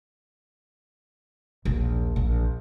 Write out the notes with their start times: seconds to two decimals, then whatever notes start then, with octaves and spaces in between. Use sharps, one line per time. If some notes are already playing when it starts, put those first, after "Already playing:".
1.65 A#1 D#2
2.16 A#1